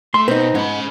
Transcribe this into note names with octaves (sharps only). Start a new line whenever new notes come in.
A3 C6
B2 C4 D#4 B4
G#2 C#4 B5